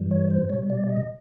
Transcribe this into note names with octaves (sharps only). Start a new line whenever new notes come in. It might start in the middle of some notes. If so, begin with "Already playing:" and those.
Already playing: G2 E3 G3
C#5
C5
B2 G3 C#5
D5
D#5